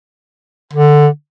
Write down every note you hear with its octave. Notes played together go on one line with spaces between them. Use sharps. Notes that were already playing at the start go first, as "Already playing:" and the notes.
D3